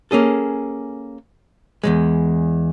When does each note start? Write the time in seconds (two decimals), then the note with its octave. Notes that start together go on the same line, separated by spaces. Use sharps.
0.11 A#3 C#4 G#4 A4
1.84 E2 G2 G#3